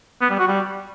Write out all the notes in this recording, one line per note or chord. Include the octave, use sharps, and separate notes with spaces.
B3
G3
F#4
G3